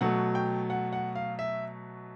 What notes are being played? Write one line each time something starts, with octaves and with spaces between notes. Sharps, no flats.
B2 F#3 A3 F#5
G5
F#5
F#5
F5
E5